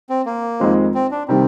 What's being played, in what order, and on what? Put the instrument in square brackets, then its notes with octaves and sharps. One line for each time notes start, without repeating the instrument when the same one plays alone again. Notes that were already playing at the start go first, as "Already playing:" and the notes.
[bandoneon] C4
A#3
[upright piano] F2 D#3 G#3 C4
[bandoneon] C4
D4
[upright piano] C3 D#3 G3 [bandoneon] C4